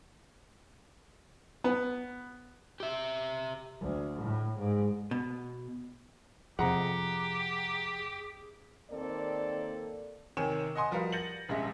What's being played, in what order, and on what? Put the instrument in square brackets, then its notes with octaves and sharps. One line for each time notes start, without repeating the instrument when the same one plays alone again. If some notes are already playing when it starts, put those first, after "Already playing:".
[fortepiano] B3
[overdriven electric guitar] G4 E5
[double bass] D2
A2
G#2
[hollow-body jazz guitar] B2
[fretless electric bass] F2 C3 [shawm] G4 [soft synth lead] G#4 [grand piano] F#5 A#5
[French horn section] D#2 A#3 C4 A4 D5
[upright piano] C3 D#3 C#5 G5 G#5 E7
D#5 F#5 G#5 C6 D#6
F3 G3 F#4 A#4 B4 F5
G6 A6 A#6 C#7 D#7 F#7
D#1 A#1 G#3 C#4 E5 A#6